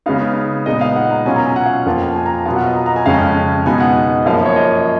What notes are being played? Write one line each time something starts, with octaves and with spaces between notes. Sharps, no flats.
C#3 G#3 B3 D#4 F5
A#2 G#3 B3 D#4 D#5
F5
F#5
A#5
B2 F#3 C#4 F4 G#5
A#5
G#5
F#5
F5
F2 F3 A#3 F4
G#5
A#5
B2 F#3 B3 F4 F5
F#5
D#5
A#5
A#5
G#5
F2 C#3 G#3 C#4 F5
B2 G#3 B3 D#4 G#5
F#5
D#5
F#2 F3 A#3 F5
C#5
D#5